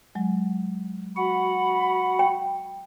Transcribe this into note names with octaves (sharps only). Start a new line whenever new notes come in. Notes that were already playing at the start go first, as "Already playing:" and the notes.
F#3 G#3
F#4 F#5 B5
G5